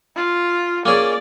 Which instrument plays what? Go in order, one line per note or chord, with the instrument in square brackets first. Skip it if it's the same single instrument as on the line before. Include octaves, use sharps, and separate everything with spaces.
[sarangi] F4
[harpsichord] A#3 C#4 G#4 [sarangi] D5